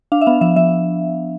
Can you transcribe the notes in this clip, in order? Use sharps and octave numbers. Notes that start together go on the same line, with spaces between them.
D4 F5
E5
B3 F5
F3 E5
F3 E5